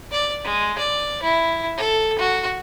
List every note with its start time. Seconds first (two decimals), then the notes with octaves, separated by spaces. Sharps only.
0.11 D5
0.44 G#3
0.78 D5
1.23 E4
1.77 A4
2.19 F#4